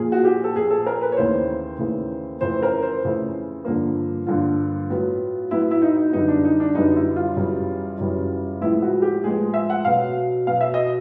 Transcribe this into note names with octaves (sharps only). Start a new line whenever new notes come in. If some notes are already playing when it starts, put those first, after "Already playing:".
Already playing: A#2 F3 A#3 G#4
F#4
G4
A4
A#2 F3 A#3 G#4
A4
A#4
B4
C#5
D#2 C#3 E3 A3 C5
D#2 C#3 E3 A3
F2 C#3 E3 A3 C5
A#4
C5
F2 C#3 E3 A3
G2 D3 F3 A#3
G2 D3 F3 A#3 F4
A2 F#3 B3
A2 F#3 B3 E4
E4
D#4
D#4
F#2 D3 G3 B3 D#4
D4
D#4
D4
F#2 D3 G3 B3 D#4
E4
F4
F#2 C#3 E3 G3
F#2 C#3 E3 G3
A2 F3 G#3 B3 E4
F#4
G4
A2 F3 G#3 B3 G#4
E5
F#5
B2 F#3 B3 F5
B2 F#3 B3 F5
E5
D#5